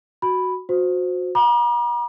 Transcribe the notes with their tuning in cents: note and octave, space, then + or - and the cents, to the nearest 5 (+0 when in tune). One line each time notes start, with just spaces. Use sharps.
F#4 +0 B5 +0
F#4 -30 C5 -10
F#5 -25 A#5 +45 D6 +40